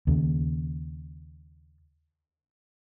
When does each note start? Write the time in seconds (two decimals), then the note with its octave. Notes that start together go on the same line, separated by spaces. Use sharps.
0.07 D#2 C#3